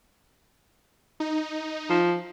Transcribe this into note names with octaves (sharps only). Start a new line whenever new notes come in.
D#4
F3